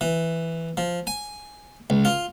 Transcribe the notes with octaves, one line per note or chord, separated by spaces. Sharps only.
E3
F3
G#5
C#2
F4